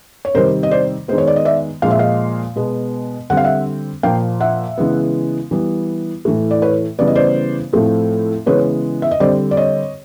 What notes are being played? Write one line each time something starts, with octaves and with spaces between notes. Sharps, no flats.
C#5
C3 D#3 G3 C4 A#4 C5
D#5
C5 D5
D#3 G#3 B3 C5
C#5
D5
D#5
D5 E5
A#2 F3 G#3 F5
E5
D#5 F5
B2 G#3 B3
D3 G3 C4 F#5
F5
E5 F#5
A#2 F3 A#3 F5 G5
E5 F#5
C#3 E3 G#3 B3
E3 G3 B3
A2 E3 A3
D5
B4 C#5
C#3 E3 G3 B3 D5
D#5
C5 D5
A2 F3 A3 C4
C#3 E3 G#3 B3 B4 C#5
E5
D#5
D3 G3 C4 C5 D5
D5
C#5 D#5